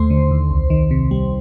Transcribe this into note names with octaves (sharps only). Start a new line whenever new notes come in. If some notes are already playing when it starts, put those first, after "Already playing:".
Already playing: D#2 A3 C5 C6
D3
D#2
C2
D#3
C3
G3